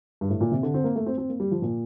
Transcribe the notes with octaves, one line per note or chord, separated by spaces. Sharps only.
G2
A2
A#2
C3
D3
C4
A#3
A3
C4
C4
A#3
G3
F3
A#2